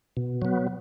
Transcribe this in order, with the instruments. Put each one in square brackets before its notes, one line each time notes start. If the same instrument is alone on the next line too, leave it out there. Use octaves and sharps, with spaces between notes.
[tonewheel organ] B2
F#3 B3